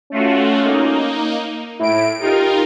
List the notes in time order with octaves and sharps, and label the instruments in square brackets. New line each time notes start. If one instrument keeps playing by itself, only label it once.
[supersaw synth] A3 F4 F#4 [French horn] C#4
[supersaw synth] A#3 D#4
[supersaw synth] A2 D7 [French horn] E4
[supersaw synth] D#4 F4 A#4 [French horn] G4